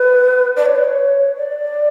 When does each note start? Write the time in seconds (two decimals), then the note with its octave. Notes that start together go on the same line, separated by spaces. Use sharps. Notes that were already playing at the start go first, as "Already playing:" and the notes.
Already playing: B4
0.56 D5
0.65 C#5
0.74 B4
0.83 C#5
1.36 D5